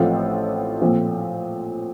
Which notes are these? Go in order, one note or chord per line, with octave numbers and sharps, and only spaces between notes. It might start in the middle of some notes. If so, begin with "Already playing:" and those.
Already playing: A1 A2 F3 C4 F4 A4
A#2 F3 C4 F4